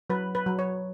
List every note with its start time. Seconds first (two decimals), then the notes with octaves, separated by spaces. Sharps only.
0.10 F#3 B4
0.35 B4
0.46 F#3
0.59 C#5